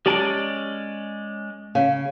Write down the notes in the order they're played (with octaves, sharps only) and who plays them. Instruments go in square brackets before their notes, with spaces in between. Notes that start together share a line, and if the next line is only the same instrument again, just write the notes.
[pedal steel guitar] G#3 C#4 D5 [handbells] G4 A5 D7
[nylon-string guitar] C#3 [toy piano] F5